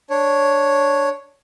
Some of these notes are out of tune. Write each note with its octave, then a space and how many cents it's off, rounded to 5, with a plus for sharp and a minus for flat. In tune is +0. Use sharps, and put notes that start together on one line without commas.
D4 +0 C#5 +0